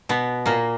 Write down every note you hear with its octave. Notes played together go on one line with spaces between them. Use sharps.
B2 B3
A#2 A#3